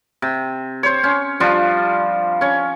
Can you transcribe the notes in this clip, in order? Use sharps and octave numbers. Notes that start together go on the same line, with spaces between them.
C3
C5 C#5
C#4
F3 G3 D4 F4
C#4 C#5